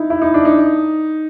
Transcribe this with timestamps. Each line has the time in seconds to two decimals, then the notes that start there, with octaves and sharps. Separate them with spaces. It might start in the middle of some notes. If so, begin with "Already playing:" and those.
Already playing: D#4 E4
0.10 E4
0.22 D#4
0.34 D4
0.45 D#4